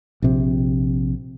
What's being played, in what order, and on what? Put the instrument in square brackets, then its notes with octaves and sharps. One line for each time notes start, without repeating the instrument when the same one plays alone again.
[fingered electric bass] A#1 C3